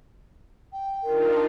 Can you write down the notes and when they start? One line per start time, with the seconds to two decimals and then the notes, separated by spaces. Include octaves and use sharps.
0.72 G5
1.04 D4 D#4 F4 A#4